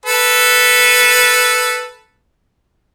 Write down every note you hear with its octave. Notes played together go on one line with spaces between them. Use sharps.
A4 B4